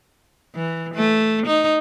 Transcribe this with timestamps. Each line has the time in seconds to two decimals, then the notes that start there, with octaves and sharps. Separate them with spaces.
0.55 E3
0.95 A3
1.47 D#4